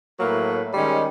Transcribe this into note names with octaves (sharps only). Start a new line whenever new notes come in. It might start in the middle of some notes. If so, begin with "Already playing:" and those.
A2 F#3 A#3 B4
D#3 G3 G#3 C#4